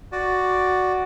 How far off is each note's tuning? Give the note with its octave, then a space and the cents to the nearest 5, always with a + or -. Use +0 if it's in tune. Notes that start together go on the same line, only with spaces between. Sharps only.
F#4 +0 D5 +0